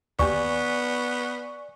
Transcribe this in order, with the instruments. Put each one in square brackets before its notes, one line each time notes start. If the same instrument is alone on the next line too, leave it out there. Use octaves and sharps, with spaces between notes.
[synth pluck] D#2 G4 [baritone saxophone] B3 [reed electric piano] D5 G#5 [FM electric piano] C#6